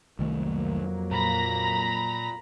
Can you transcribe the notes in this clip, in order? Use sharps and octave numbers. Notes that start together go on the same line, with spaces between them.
C2 F2 D#3 F#3 A3 A#3
A#2 A#5 B5 A#6